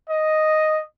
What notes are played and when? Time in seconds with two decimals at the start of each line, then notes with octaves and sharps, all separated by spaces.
0.09 D#5